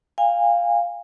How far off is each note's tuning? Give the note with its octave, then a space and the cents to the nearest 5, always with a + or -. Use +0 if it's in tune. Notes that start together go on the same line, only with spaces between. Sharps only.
F5 +0 G#5 -35